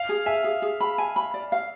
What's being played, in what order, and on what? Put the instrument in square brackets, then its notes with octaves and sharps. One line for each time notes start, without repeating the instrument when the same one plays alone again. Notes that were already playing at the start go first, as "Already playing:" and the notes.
Already playing: [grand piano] F5
[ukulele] G#4
[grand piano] E5 [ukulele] G#5
[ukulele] G#4
G#4
B5
G#5
B5
D5
F5